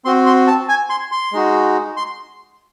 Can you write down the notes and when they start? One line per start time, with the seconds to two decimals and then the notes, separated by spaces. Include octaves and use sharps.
0.05 C4 F#4 C6
0.26 C6
0.47 A5
0.69 G#5
0.90 C6
1.12 C6
1.33 G#3 D#4 F#4
1.97 C6